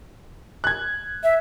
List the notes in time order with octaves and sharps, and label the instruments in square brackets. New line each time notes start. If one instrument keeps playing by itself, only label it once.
[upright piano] F#6 G#6
[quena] E5